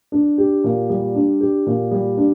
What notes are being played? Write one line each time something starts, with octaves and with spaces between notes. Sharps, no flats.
D4
G4
A#2
G3
D4
G4
A#2
G3
D4